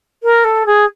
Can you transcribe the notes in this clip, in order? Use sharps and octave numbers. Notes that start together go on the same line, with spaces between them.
A#4
A4
G#4